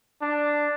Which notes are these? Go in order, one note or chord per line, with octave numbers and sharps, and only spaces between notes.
D4